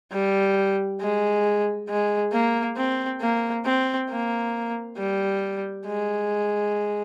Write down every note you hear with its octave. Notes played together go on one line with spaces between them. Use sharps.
G3
G#3
G#3
A#3
C4
A#3
C4
A#3
G3
G#3